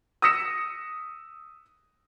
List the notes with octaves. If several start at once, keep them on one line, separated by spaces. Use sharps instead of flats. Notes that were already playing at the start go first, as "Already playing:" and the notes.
D#6 E6 A#6 B6 C#7 E7